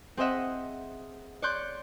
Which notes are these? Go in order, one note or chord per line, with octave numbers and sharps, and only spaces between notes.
C4 G#4 C5 D#5 E5 F#5
C#5 D5 C6 C#6 F#6 G6